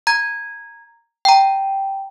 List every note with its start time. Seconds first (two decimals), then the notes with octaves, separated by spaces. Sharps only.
0.07 A#5 G#6
1.25 G5 A#5